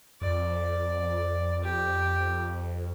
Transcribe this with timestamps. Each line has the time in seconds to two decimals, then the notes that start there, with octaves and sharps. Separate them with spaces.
0.21 F2 D5
1.64 G4